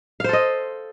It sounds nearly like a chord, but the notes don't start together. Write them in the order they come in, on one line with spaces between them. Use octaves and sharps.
F5 C5 A4 D#5